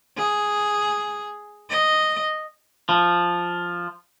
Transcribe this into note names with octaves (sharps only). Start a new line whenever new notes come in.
G#4
D#5
F3